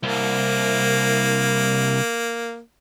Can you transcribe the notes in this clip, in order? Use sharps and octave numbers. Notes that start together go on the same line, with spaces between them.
C2 A#3